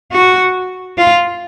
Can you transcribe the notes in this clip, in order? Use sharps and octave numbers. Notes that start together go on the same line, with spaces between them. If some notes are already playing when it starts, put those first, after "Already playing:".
F#4
F4